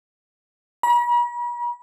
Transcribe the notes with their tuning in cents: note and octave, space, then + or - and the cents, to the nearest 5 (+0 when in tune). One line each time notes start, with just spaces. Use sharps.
B5 -45